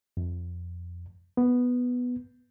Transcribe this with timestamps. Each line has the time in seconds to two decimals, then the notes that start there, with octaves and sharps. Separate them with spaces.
0.17 F2
1.37 B3